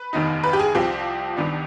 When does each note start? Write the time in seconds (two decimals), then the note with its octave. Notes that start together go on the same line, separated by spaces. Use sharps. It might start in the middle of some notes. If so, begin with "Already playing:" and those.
Already playing: B4
0.13 F1 D#2 D#3 B3 D#4
0.44 B4
0.53 G4
0.59 G#4
0.75 C2 C3 F3 C4 G4
1.37 C2 C3 D#3 B3 D4